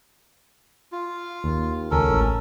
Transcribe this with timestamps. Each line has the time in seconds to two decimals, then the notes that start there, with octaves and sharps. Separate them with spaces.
0.92 F4
1.44 D#2
1.91 C#2 C#4 A4 A#4
2.09 A1